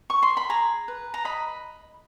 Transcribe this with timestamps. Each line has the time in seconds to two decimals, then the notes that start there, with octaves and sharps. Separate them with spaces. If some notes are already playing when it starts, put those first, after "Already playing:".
0.10 C#6
0.23 C6
0.37 B5
0.50 G#4 A#5
0.88 B4
1.14 A#5
1.25 D#5 B5